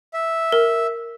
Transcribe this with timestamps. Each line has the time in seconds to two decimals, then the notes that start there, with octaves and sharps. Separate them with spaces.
0.14 E5
0.52 A#4